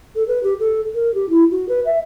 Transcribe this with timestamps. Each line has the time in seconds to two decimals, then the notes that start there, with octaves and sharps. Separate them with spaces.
0.16 A4
0.28 B4
0.43 G4
0.60 A4
0.95 A#4
1.15 G4
1.30 E4
1.51 F#4
1.69 B4
1.85 E5